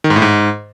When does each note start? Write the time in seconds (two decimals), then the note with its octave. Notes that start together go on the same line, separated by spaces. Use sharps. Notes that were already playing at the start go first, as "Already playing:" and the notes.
0.04 D#3
0.10 G#2
0.16 A2
0.22 G#2